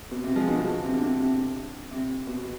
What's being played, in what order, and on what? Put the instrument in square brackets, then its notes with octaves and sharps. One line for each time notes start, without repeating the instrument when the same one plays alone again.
[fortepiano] B2
C3
F3 G#3
B2 D3
C3
D3
C3
C3
C3
B2